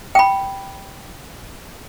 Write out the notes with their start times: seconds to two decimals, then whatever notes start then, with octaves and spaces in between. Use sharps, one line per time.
0.15 G5 B5